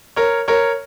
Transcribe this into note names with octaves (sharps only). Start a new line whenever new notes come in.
A#4 C#5
A#4 C#5